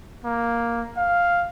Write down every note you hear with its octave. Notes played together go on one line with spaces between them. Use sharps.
A#3
F5